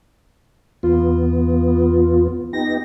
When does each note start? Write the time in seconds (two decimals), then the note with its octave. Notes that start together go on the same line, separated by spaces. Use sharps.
0.83 E2 B3 F4
2.53 B3 D#4 G4 A#6